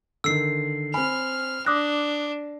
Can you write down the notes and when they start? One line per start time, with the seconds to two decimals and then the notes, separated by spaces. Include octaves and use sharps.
0.24 D3 D#3 E6 C7
0.94 C4 G#5 B5 F6
1.66 D4 D6 D#6 F#6 A#6